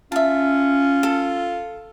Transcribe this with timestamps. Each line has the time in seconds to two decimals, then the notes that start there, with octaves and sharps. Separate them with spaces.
0.12 C#4 F4 E5 A5
1.03 A4